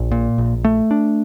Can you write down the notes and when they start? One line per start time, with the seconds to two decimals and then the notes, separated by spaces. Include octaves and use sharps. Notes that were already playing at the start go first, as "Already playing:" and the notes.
Already playing: A#1
0.12 A#2
0.38 A#1
0.64 A3
0.91 D4